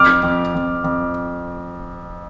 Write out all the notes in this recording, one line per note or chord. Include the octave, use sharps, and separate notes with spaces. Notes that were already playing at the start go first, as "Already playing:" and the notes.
Already playing: F2 D6 F6
F2
F2
F2